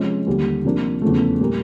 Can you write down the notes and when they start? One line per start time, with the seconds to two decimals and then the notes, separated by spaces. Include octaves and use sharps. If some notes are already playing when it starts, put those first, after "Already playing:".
Already playing: C3 F3 G#3 C#4
0.27 D#2 D3 G3
0.65 C3 F3 A#3 D4
1.02 E2 C#3 F3 A3
1.40 A#2 G3 A#3